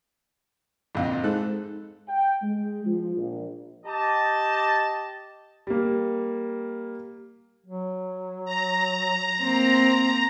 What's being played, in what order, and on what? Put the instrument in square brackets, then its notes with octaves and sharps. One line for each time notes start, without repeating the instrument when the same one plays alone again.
[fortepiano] A#1 F2 D#4
[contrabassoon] G#2 [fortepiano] A4 F#6
[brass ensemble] G5
G#3
F3
A#1
G4 D#5 A5
[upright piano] G3 A#3
[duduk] F#3
[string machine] A#5
[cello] A#3 C4